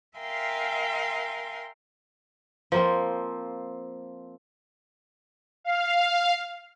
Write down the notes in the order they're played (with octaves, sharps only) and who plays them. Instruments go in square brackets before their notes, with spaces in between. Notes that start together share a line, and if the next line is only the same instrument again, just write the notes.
[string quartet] A#4 E5 F5 G5 G#5 C6
[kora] F3 A#3 C4
[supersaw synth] F5